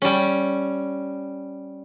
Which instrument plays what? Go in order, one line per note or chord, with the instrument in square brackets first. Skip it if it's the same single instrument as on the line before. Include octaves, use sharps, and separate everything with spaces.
[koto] G3 C#4